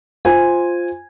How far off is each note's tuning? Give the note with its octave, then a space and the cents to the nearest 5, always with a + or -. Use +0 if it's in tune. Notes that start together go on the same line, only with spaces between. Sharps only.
F4 +0 C5 +0 G#5 -10